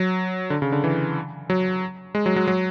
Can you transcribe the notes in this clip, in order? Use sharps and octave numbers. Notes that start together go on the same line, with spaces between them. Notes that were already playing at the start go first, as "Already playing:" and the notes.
Already playing: F#3
D3
C#3
D3
E3
F#3
G#3
F#3
F#3
F#3